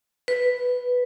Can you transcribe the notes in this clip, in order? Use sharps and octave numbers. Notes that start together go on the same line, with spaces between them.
B4